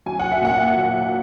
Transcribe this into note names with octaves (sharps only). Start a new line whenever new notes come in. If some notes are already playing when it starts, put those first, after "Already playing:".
F#3 G#5
F#5
E5
A#2 F#5
F#3